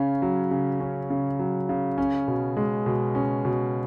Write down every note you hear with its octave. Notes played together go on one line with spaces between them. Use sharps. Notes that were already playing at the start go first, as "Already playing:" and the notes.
Already playing: C#3 C#4
F#3
C#3
C#4
C#3
F#3
C#3
C#4
B2
G#3
B2
C#4
B2